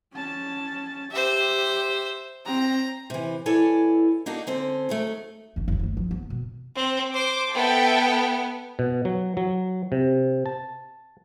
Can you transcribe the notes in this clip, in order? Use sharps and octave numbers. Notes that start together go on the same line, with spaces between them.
C#4 A5
G4 C5 E5
C4 A#5
C3 E3
E3 E4 A4 C#5 D5 G#5
A#3 D4 D#4 F#4 A4
D3 C4 C#4
D#2 F#3 A3
F#1 D3
F#1 D#2
G1 A3
F3 F#3
B3
B2
C4
C5 D6
B3 A4 E5 G5
B2
F#3
F#3
C3
A5